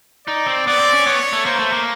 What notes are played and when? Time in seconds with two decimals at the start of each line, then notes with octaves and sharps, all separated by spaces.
0.27 D#4 D5
0.47 C4
0.66 B3 D5
0.79 C4
0.93 C#4
1.06 B3 C#5
1.33 A3
1.46 A#3 C5
1.59 A3
1.72 A#3